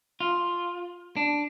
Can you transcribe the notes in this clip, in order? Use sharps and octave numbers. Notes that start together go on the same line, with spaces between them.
F4
D4